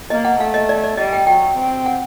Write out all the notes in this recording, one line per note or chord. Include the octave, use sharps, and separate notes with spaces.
A#3 D#5
F#5
A3 F5
D#5
D5
D5
G3 D#5
G5
F#3 G5
C4
F#5